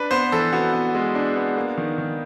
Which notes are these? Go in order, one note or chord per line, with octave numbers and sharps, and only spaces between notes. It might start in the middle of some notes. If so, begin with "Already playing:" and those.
Already playing: D4 B4
B3 C5
E3 A4
B3 F#4
B3
G#3
D4
B3
A#3
D#3
D#3